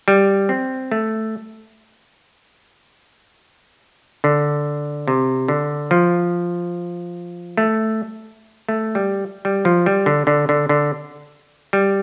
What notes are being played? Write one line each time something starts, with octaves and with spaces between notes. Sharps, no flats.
G3
C4
A3
D3
C3
D3
F3
A3
A3
G3
G3
F3
G3
D3
D3
D3
D3
G3